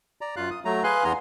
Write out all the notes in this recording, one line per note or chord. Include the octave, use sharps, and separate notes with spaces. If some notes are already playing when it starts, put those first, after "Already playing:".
D5 A#5
F#2 F4 F5 F#6
D#6
F#3 A3 A#5
G#4 B4 F5 G#5 C6 F#6
E2 E3 B3 A#5 C6